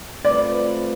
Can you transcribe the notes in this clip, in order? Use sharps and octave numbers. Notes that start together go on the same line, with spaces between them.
A3 C4 F4 B4 D5